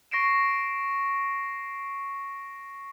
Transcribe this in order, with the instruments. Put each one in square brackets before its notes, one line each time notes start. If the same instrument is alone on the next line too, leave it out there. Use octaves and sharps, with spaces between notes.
[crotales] C#6 A#6 C7 D7 E7